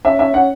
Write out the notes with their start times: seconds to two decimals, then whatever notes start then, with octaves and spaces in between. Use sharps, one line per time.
0.05 C#4 E5
0.19 C#4 E5
0.33 C#4 F#5